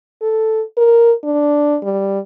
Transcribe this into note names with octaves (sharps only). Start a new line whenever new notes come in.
A4
A#4
D4
G3